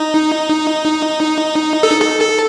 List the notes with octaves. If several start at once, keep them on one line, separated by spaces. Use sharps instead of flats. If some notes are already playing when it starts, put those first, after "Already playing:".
Already playing: D#4
A4
A4
A4